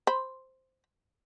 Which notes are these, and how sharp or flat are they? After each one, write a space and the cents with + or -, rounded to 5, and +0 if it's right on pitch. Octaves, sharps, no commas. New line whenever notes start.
C5 +0 B5 +0